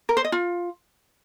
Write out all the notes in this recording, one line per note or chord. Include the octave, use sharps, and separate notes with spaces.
A#4
C5
D#5
F4